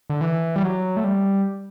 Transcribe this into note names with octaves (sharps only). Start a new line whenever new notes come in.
D3
E3
G3
F#3
A3
G3